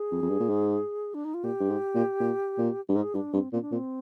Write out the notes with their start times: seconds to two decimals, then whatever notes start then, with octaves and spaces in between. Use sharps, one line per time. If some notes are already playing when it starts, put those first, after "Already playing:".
Already playing: G#4
0.11 F2
0.22 F2
0.30 G2
0.40 A#2
0.49 G#2
1.14 D4
1.25 D#4
1.34 F4
1.44 A#2 G4
1.60 G2
1.70 G#2
1.95 A#2
2.20 A#2
2.58 A#2
2.89 G2 G4
2.96 G#2 G#4
3.14 G2 D4
3.33 G2 C4
3.53 A#2 C4
3.62 D4
3.72 A#2 C4